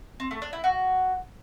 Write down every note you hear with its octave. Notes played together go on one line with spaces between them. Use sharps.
C4
A3
D4
E4
F#4